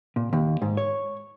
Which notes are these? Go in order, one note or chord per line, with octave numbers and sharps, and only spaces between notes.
A#2
D#2
G#2
C#5